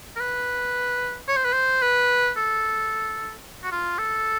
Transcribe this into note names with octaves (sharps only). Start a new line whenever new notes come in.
A#4
B4
C#5
C5
B4
C5
B4
A4
F#4
F4
A4